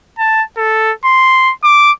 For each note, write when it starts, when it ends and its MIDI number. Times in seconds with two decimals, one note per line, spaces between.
0.19 0.42 81
0.57 0.92 69
1.05 1.53 84
1.64 1.92 86